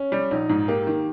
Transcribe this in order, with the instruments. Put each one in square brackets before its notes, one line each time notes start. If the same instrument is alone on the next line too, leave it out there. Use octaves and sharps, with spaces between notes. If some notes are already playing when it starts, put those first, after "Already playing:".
Already playing: [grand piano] C#4
[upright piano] G3
[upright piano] A#1 [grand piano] D#4
[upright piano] G#2
[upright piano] A#3 [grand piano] G4
[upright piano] D#3